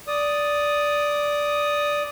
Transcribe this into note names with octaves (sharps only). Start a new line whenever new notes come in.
D5 D#6